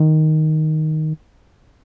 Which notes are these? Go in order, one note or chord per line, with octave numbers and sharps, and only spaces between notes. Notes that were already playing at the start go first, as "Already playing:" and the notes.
Already playing: D#3